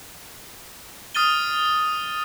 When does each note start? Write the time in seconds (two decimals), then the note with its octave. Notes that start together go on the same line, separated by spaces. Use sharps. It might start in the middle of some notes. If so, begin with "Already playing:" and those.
1.15 D#6 F6 A6 D#7 G7